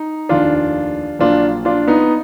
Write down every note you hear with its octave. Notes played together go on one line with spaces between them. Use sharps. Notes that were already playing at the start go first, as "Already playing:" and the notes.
Already playing: D#4
F1 D#2 D#3 D4 F4
A#1 A#2 F#3 D4 F4
D4 F4
B3 D#4